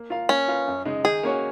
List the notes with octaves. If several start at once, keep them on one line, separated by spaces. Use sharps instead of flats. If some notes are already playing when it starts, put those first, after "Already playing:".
Already playing: A#3
F4 A#4 F5
A#3 C#4
F4 B4 F5
F#2
C#3 G#3 D#4
D#3 G#4
A#3 C#4 F#4 C#5